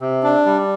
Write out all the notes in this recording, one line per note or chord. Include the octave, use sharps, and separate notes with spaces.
C3
D4
G3